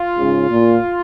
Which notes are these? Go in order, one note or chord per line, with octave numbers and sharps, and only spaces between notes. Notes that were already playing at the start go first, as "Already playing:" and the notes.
Already playing: F4
G#2 C#3
A#2